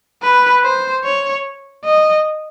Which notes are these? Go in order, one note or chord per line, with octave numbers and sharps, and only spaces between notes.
B4
C5
C#5
D#5